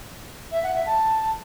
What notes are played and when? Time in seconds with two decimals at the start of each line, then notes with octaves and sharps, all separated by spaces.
0.52 E5
0.63 F#5
0.75 E5
0.86 A5